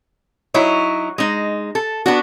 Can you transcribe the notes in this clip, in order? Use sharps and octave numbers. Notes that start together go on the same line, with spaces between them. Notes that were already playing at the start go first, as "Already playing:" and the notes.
F#3 D#4 E4
G#3 D#4
A4
B3 D4 F#4